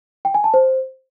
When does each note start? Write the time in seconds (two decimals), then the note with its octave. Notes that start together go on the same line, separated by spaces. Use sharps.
0.25 G5
0.34 G#5
0.44 A5
0.54 C5